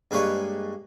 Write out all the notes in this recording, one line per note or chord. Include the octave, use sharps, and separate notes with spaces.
G2 G#3 A#3 B4 C#5 D5